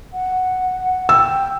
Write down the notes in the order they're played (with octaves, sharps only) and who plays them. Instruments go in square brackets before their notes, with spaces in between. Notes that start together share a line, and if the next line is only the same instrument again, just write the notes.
[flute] F#5
[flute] G5 [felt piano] E6